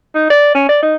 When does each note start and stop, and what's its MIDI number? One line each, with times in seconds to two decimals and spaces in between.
0.15 0.27 63
0.30 0.54 74
0.55 0.64 61
0.69 0.79 74
0.82 0.96 63